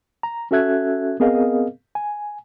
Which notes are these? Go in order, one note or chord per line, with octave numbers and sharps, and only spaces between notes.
A#5
C#4 F#4 A4 E5 F#6 G#6
B3 C4 G#4 A#4 D#5 F5
G#5